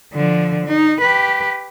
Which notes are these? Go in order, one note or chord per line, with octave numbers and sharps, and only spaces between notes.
D3 F3
D#4
G4 B4